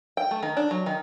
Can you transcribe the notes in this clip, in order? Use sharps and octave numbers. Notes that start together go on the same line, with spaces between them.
G5
A3
D#3
D4
F#3
D#3